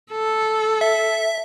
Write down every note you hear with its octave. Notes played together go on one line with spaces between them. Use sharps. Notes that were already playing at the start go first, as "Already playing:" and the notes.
A4
E5